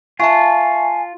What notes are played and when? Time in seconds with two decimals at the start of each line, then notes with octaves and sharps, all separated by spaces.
0.20 F4 E5 F#5 G#5 A5 C#6